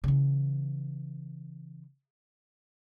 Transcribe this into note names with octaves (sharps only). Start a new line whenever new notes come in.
C#3 E3